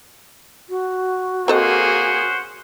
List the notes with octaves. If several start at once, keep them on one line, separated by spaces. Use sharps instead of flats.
F#4
A#3 C4 C#4 G#4 A4 C5 D#5 F#5